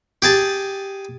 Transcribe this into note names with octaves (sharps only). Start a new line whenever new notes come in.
G4 G#4 A5